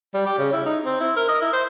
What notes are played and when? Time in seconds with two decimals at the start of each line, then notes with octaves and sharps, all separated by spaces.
0.14 G3
0.26 G4
0.39 C#3
0.53 E4
0.66 D#4
0.85 C4
1.01 E4
1.16 A#4
1.29 D#5
1.42 E4
1.53 C5